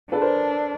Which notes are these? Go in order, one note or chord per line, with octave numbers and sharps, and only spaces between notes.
D4 A4 B4
A#4 C5